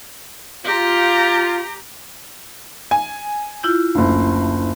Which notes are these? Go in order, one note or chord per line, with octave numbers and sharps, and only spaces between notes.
F4 G4 A#5
G#5
E4 F4 G6
F#1 D2